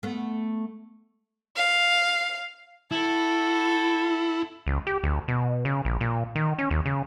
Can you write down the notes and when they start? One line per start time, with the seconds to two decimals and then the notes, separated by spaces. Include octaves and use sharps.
0.03 A3 B3
1.57 F5
2.91 E4 F#4 A4
4.67 C#2
4.87 G4
5.04 D2
5.28 B2
5.65 C#3
5.85 A#1
6.01 A#2
6.35 D#3
6.58 C#4
6.71 D#2
6.86 C#3